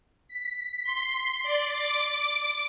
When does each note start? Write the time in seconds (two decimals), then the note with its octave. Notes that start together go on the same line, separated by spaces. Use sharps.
0.28 B6
0.84 C6
1.43 D5
1.74 D6